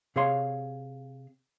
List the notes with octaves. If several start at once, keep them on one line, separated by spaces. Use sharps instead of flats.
C3 G#4 C#5 F5 C6